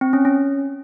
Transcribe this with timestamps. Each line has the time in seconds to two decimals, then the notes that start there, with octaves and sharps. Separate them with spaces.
0.01 C4
0.13 C#4
0.25 C#4